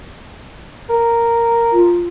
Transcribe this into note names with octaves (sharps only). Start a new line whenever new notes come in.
A#4
F4